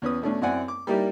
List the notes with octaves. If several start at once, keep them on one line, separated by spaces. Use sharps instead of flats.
E2 C#4 B4 D#6
B2 A3 C#4 D4
F#2 C4 E4 D5 F#5 G#5
D6
G3 A#3 D#4 E4 G4 D5